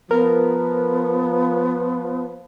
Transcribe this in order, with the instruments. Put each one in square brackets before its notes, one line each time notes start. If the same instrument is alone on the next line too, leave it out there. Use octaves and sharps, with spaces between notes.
[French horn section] F3 [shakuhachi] B3 [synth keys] A#4